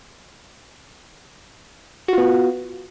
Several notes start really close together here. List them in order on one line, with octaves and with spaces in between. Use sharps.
F#4 F4 B3